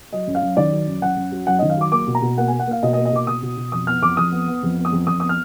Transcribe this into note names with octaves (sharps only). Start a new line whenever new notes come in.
F#3 D#5
F#2
F5
F#2
D#3 D5
F#3
F#2
F#2 F#5
F#2
F#3
F#2 F#5
D#3 D#5
F5
F#3 D6
A#3 D6
B2
A#5
B2
A#3 F#5
A#3 G#5
F#5
A#3 F5
B2 D#5
D#5
A#3
D#5
B2 D6
B2 D#6
B2
B2
F2 D#6
B3 F6
F2 D6
F2 D#6
B3
B3
F2
B3
D#6
F2
F2 D#6
B3 D#6
F6